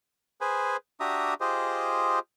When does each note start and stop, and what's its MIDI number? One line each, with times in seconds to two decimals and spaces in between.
0.41 0.77 68
0.41 0.77 71
0.41 0.77 72
0.41 0.77 80
1.00 1.34 62
1.00 1.34 66
1.00 1.34 67
1.00 1.34 76
1.00 1.34 82
1.00 1.34 87
1.41 2.19 65
1.41 2.19 67
1.41 2.19 68
1.41 2.19 72
1.41 2.19 75